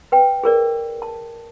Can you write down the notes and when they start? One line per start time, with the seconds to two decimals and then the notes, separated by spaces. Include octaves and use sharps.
0.12 B4 G5
0.43 G#4 A#4 D5
1.02 A5